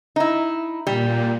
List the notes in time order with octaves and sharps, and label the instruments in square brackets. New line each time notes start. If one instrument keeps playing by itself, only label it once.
[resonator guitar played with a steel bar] D#4 E4
[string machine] A#2 [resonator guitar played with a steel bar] G3